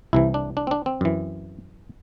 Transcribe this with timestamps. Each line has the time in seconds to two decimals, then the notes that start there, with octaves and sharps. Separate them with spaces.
0.13 C2 C3 E3 E4
0.34 D4
0.57 D4
0.67 C4
0.71 D4
0.86 C4
1.01 F#2 E3